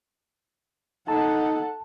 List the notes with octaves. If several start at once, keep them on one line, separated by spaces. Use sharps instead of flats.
D#4 A4 F#5 A5